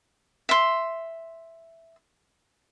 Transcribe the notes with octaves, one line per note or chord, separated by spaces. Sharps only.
E5 C6